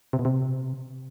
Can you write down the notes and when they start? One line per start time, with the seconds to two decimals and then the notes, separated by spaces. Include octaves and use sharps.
0.13 C3
0.19 B2
0.25 C3